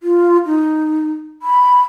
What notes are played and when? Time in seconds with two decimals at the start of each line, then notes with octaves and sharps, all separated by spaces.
0.03 F4
0.46 D#4
1.42 B5